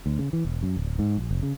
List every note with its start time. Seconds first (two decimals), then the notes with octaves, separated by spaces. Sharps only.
0.06 D2
0.19 C#3
0.33 E3
0.45 E1
0.63 F#2
0.77 D1
0.99 G#2
1.17 A#1
1.31 F1
1.43 C#3